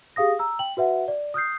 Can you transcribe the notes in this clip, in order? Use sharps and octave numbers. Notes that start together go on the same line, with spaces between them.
G4 G#4 F5 D#6 A#6
A#5 E6
G5 F#7
F#4 B4 E5 F#5
D5
D#6 F6 G6 C7